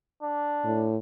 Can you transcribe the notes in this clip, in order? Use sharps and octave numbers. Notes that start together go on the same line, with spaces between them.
D4
A2